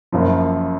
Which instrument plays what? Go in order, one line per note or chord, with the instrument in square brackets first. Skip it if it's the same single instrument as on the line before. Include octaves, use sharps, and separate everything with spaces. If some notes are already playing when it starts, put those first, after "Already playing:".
[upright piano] F#1 F#2 F3